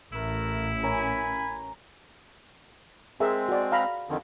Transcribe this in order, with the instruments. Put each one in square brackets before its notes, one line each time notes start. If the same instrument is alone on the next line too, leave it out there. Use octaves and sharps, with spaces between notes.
[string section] A1 [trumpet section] A3 A#4 [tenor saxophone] E4
[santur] C#4 A#4 [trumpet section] G#5 B5
[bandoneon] G#3 C4 [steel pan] G#4 A#4 E5
[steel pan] F#4 D5
F5 A#5 B5
[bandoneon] F2 D3 D#3